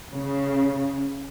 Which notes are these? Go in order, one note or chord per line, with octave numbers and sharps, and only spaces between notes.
C#3